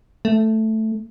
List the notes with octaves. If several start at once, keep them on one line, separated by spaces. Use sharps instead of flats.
A3